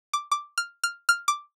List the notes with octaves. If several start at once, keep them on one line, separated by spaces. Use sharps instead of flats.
D6
D6
F6
F6
F6
D6